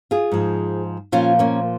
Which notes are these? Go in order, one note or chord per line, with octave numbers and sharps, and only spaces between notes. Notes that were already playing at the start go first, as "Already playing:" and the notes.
F4 G#4
G#2 F3
A#2 F3 C#4 F4
A#3 C#4